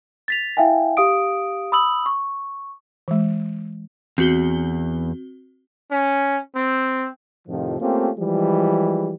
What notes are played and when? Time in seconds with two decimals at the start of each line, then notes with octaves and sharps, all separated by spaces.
0.28 A6 B6 F7
0.57 E4 E5 F5 G5 G#5
0.97 G4 F5 D#6 D7
1.72 B5 D#6 E6 F#7
2.06 C#6
3.08 E3 G#3
4.18 E2 C4 F#4 G7
5.91 C#4
6.55 C4
7.47 F2 A2 C3 D#3 F3
7.80 A3 A#3 C4 C#4 F4 G4
8.18 E3 F3 G3 G#3